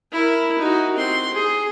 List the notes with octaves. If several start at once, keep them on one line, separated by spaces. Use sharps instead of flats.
E4 A#4
D#4 F#4
C4 C6
G#4